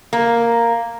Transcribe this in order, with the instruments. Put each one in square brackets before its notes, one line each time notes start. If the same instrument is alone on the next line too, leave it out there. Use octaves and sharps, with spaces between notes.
[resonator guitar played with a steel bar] A#3